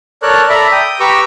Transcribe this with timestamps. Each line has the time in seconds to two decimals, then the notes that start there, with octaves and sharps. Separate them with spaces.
0.22 A4 A#4 C#5 D5 A5 F#6
0.49 A4 D5 E5 A#5 B5
0.72 G5 D#6
1.00 G4 B4 A#5 C#6 D6 E6